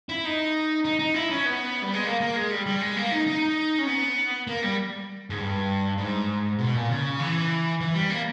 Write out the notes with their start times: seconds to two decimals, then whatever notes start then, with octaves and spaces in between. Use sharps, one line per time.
0.09 E4
0.25 D#4
0.85 D#4
0.99 D#4
1.14 E4
1.30 C#4
1.45 B3
1.82 G3
1.93 G#3
2.05 A#3
2.21 A#3
2.36 G#3
2.50 G3
2.66 G3
2.81 G#3
2.96 A#3
3.11 D#4
3.27 D#4
3.78 C#4
3.87 B3
4.47 A#3
4.63 G3
5.30 G#2
5.39 G2
5.98 G#2
6.59 B2
6.75 A#2
6.90 C#3
7.19 E3
7.80 E3
7.94 G3
8.10 A#3